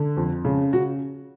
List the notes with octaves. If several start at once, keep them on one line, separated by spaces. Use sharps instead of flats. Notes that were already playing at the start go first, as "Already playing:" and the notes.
Already playing: D3
F2
C#3
C#3 F#4